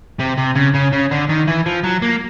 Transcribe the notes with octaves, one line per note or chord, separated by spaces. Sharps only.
C3
C3
C#3
C#3
C#3
D3
D#3
E3
F3
F#3
A#3